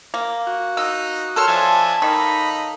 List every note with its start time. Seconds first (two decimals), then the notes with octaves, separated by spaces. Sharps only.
0.14 A#3
0.47 F#4
0.77 D#4 E6
1.36 A4 C#5 C6 E6 F6
1.48 F3 D4 E5 G#5 A5
2.02 D#3 A#3 D#4 B5